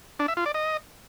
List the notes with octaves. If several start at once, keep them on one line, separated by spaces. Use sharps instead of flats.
D4
E5
F4
D5
D#5